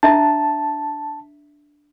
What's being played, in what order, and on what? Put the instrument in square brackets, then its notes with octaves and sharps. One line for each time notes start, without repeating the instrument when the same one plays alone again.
[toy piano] D4 E5 A#5 [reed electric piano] A5